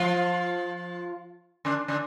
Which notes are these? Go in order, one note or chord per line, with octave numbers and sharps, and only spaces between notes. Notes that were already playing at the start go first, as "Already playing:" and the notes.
Already playing: F3 F4
D3 D4
D3 D4